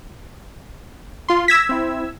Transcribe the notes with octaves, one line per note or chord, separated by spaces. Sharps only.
F4 C6
E6 G#6 A#6 B6
C4 E4